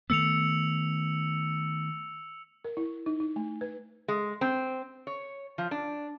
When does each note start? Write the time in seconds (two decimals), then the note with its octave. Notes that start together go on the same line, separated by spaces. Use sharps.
0.10 D#3 A3 B3 E6 C#7 F7
2.65 A#4
2.77 E4
3.06 D#4
3.20 D#4
3.36 A3
3.61 B4
4.08 G#3
4.41 C4
5.07 C#5
5.58 F3
5.71 D4